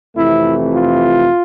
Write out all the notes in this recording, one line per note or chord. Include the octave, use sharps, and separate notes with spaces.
F2 C3 E3 A3 E4
F4